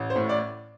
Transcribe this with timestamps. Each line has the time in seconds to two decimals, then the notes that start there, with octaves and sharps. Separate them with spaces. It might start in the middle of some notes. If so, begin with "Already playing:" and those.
Already playing: A1
0.10 C5
0.16 A2
0.29 D5